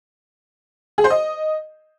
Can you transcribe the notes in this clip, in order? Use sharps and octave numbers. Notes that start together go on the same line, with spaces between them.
G#4
C5
D#5